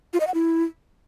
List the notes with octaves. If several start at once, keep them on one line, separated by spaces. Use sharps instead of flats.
F4
D#5
F#5
E4